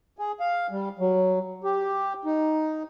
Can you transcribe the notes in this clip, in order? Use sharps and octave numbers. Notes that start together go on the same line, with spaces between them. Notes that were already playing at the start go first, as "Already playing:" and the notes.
G#4
F5
G3
F#3
G4
D#4